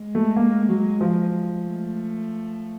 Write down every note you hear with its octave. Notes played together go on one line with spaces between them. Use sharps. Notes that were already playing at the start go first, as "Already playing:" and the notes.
Already playing: G#3
A3
A#3
F#3
F3
A3